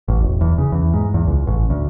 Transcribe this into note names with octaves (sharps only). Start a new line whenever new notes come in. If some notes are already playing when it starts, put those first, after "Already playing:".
A1
E1
E2
C#3
E2
G#2
E2
C#2
A1
D2